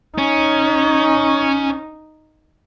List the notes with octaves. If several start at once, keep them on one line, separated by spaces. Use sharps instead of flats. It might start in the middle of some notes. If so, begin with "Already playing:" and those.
C#4 D#4